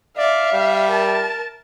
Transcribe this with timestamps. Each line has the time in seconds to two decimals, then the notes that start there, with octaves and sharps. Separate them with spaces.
0.17 D5 E5 F5
0.53 G3
0.88 A#4 A5